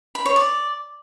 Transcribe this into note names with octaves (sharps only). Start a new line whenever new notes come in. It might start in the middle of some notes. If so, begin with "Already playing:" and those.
B5
C#5
D5